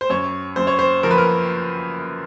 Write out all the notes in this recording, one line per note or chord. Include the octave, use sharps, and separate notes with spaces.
C5
F#2 C#5
F#2 C5
C#5
C5
F3 A#4
B4
A#4